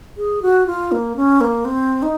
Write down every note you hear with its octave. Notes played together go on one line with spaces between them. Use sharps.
G#4
F#4
F4
A#3
C#4
A#3
C4
D#4